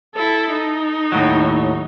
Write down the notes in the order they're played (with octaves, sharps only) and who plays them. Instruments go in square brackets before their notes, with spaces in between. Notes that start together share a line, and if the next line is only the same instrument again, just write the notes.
[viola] E4 A4
D#4
[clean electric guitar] D#2 A2 F#3